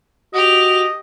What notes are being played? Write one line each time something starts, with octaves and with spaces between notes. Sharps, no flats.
F#4 G4 D#5 F7